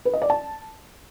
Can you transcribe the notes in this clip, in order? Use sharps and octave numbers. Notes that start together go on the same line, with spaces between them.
B4
D#5
D5
A5